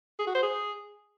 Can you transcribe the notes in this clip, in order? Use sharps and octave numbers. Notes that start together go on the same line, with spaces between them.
G#4
F#4
C5
G#4